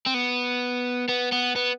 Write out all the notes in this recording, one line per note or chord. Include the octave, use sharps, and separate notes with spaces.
C4
B3
B3
B3
B3